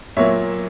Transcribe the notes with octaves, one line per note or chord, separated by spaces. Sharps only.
A#2 F#3 A#3 C#5 E5